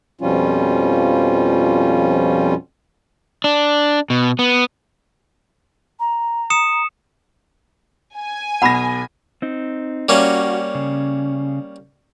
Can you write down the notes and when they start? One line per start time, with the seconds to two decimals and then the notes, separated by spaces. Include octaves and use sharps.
0.21 F2 B2 F3 G3 C#4 F4
3.44 D4
4.10 B2
4.39 B3
5.99 A#5
6.50 D#6 C#7 E7
8.15 G#5
8.62 B1 B2 F#5 B5 A#6
9.42 C4 D#4
10.09 G3 A#3 C#4 F#4
10.75 C#3